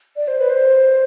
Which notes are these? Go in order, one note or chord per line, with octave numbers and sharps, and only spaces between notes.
D5
C5
B4
C5